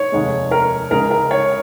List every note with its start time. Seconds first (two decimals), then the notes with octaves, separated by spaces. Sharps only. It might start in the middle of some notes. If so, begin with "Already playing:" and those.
Already playing: C#5
0.12 F1 D#2 D#3 G#3
0.51 A#4
0.91 C#2 C#3 G#3 A#4
1.11 A#4
1.31 C#5